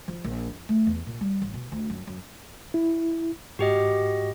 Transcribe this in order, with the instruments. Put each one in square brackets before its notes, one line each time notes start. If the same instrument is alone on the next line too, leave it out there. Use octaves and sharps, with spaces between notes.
[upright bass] F3
A#1
F2
A3
E2
A#2
G3
A1
B2
D2
F#2
F#2
[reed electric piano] E4
[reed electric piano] G#2 [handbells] F#4 G4 D#5